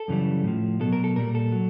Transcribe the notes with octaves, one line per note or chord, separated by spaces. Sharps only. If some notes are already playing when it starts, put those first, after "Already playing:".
Already playing: A4
F#2 C#3 E3 G3
A2 F3
B2 F#3 A4
A#4
A4
A#2 G3 A#4
A4
F#3